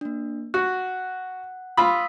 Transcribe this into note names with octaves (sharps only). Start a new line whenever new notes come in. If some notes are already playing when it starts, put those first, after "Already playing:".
A#3 D4
F#4 F#5 F#6
F4 B5 D#6 E6 B6